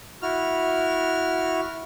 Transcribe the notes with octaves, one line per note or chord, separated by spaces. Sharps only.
E4 F#4 F6